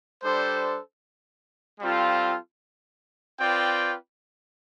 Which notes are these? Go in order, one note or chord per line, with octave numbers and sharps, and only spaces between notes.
G3 D4 A4 C5
G3 C4 F4 A4 C5
C4 F4 B4 D5 G5